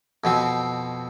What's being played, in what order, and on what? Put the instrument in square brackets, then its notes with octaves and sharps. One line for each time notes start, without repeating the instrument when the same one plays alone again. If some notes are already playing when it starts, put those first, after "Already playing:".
[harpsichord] F2 B2 C4